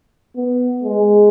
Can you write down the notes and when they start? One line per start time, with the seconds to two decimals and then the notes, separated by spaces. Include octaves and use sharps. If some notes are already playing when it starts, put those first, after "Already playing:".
0.36 B3
0.84 G#3